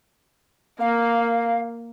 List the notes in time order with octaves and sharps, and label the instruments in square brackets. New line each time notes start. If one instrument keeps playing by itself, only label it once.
[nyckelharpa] A#3 [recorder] F5